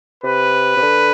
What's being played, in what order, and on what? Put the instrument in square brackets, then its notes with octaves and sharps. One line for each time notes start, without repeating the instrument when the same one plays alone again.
[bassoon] C3 [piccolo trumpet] B4
[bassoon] C3
D3